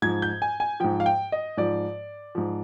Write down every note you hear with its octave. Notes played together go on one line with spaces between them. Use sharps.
G#2 F3 G#6
G6
G#5
G#5
G#2 F3 G5
F5
G5
D#5
G#2 F3 D5
G#2 F3